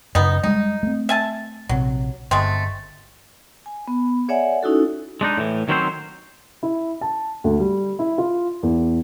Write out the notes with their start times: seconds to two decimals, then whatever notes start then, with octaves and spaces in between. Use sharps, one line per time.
0.15 F#2 C#3 B3 D#4
0.43 G3 G#3 D#4
0.83 A3 C4
1.09 E5 G#5 A5
1.69 A#1 C3 F#3
2.31 G1 G#3 A3 C4
3.66 G#5
3.88 B3
4.29 G#4 C#5 D5 E5 F#5 G#5
4.63 C#4 D#4 E4 F#4 A4
5.21 G#3 D4 D#4
5.37 A2 E3
5.69 D#3 F#3 C4 C#4 F#4 C5
6.63 E4
7.01 A5
7.44 D2
7.60 G3
7.99 E4
8.18 F4
8.63 E2